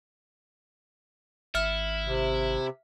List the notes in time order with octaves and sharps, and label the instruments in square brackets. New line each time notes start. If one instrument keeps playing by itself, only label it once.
[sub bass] G#1 [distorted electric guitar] E4 [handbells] E5 F6 C#7
[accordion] C3